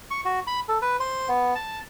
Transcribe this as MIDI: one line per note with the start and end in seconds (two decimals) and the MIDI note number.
0.11 0.21 85
0.25 0.40 66
0.47 0.60 83
0.69 0.78 69
0.82 0.96 71
1.00 1.29 72
1.29 1.54 59
1.55 1.79 81